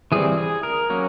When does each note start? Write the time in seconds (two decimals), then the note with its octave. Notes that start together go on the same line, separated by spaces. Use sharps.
0.12 E3 G3 C4 G#4
0.38 G#4
0.63 A#4
0.90 F#3 A#3 C#4